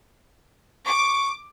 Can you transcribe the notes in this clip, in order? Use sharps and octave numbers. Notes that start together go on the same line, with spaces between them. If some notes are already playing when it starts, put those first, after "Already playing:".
C#6 D6